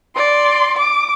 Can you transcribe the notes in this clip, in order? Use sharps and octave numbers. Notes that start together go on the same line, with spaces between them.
D5 C6
D6